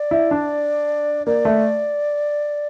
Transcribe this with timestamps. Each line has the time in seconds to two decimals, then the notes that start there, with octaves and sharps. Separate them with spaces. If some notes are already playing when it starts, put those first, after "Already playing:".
Already playing: D5
0.11 E4
0.31 D4
1.27 A#3 D5
1.45 A3